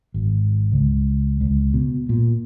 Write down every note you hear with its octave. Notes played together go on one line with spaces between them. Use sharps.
G#1
C#2
C#2
B2
A#2